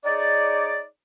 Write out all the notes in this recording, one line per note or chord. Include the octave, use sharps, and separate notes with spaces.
D#4 G#4 C#5 D5